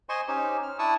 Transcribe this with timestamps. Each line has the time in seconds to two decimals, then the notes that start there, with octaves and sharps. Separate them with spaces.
0.09 C5 D#5 G#5 C6 C#6
0.28 C#4 D#4 G4 C5
0.63 F6
0.79 D4 E4 A5 C#6 D#6 E6